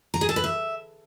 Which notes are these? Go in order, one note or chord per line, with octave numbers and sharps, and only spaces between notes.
A#5
G#4
A4
B4
E5